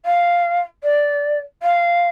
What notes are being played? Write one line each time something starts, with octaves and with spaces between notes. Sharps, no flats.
F5
D5
F5